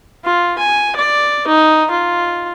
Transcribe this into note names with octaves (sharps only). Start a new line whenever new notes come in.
F4
G#5
D5
D#4
F4